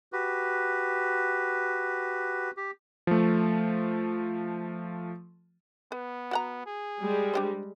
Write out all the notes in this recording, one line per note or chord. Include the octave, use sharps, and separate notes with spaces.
F#4 G4 B4
G4
F3 A3
B3 B4
F#4 F#5 A#5
G#4
G3 G#3
D4 G4 C5